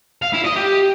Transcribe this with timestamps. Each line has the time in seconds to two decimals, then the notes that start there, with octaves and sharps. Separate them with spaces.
0.22 F5
0.33 E4
0.44 D#5
0.56 G4